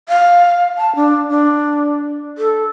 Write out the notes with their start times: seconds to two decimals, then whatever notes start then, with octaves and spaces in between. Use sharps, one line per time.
0.09 F5
0.78 A5
0.96 D4
1.29 D4
2.38 A4